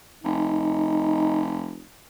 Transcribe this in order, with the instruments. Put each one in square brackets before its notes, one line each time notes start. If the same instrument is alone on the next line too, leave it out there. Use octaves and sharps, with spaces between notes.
[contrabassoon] F1 [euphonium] D#4